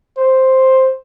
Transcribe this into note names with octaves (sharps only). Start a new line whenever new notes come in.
C5